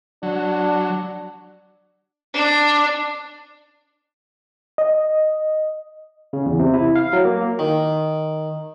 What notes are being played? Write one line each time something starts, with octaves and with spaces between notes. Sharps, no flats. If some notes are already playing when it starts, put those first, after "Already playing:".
F#3 D4
D4
D#5
C#3
E2
C3
E4
F5
F#3
A#3
D#3